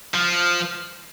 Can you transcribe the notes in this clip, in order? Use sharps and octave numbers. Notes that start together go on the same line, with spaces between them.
F3